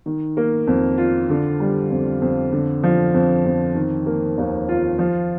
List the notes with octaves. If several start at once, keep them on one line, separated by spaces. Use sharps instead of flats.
D#3
A#3
F2
F4
D3
G3
F2
F2
D3
F3
F2
F2
D#3
A#3
D#2
F4
F3